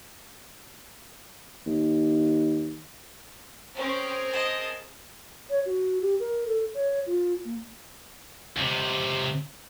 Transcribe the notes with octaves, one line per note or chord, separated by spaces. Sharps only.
D#2
C4 C#4 G#4 A#4 C5
D#5 A5
C#5
F#4
G4
A#4
A4
C#5
F4
A#3
C#2 C3